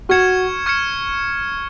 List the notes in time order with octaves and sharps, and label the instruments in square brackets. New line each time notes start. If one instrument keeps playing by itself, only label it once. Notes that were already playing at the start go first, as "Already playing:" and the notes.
[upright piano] F#4 [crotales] C#6 F6 G#6 C#7 E7
[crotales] C#6 F6 G#6 C#7 E7